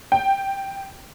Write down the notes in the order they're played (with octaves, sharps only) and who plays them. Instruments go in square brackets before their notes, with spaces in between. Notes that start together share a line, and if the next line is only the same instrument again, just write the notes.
[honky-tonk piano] G5